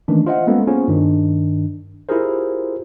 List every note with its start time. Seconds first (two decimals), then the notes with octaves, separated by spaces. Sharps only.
0.08 D#3 E3 A3 A#3 C#4 D4
0.26 F4 C5 D#5 E5 F#5
0.46 G3 G#3 A#3 B3 C#4 A4
0.67 A#3 B3 C#4 F4 G#4 C5
0.88 G2 D#3 D4
2.09 E4 F4 G4 G#4 A#4 C5